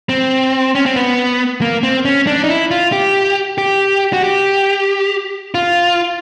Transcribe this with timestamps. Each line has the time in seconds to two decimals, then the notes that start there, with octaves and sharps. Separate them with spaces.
0.09 C4
0.75 C#4
0.86 C4
0.96 B3
1.62 A#3
1.83 C4
2.05 C#4
2.27 D4
2.44 D#4
2.49 E4
2.71 F4
2.92 G4
3.58 G4
4.13 F#4
4.24 G4
5.54 F4